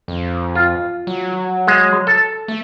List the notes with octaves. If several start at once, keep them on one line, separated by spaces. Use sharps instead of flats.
F2
F4
F#3
G#3
A4
A3